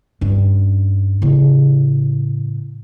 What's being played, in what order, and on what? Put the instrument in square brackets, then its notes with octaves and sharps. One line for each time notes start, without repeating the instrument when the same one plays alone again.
[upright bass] G2 C#4
A2 C#3